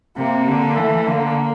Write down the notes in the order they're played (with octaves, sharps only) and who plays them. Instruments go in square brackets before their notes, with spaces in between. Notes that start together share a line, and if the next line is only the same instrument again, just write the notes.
[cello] C3 [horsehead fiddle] A#3
[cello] D3
[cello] E3 [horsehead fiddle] A3
[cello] D3 [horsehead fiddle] A#3